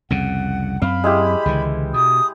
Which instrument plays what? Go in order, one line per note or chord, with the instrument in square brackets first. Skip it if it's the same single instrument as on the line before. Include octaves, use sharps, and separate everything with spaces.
[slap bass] C2 F2 C#3 [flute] F#5
[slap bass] F#2 C4 [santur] F5 [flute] B5
[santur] G#3 E4 G4
[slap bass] C#2 D3 E3
[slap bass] B2 [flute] D#6